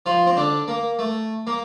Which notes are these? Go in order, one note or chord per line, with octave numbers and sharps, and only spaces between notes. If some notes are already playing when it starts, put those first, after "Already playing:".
F3 F4
C4
D3 D4
A#3
A3
A#3